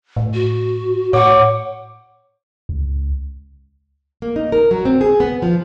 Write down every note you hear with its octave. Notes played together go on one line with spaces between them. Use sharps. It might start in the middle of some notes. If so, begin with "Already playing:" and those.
A2
F#4
A2 C#5 F#5 D6
C#2
A#3
D#4
A#4
F#3
C4
G#4
B3
F3